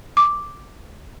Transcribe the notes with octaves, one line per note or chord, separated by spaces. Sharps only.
D6